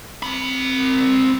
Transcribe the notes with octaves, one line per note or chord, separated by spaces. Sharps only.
C4 B5